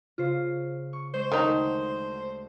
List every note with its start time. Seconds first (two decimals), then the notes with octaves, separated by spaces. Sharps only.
0.18 C#3 F4 C5
0.93 C#6
1.14 G#3 C5
1.32 D2 D#3 F#3 D#4 A#4